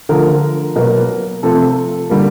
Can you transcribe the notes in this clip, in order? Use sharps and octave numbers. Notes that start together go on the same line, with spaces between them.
D3 F3 A3 A#4
B2 F#3 A#3 A#4
C3 F3 A3 A4
D3 G3 A#3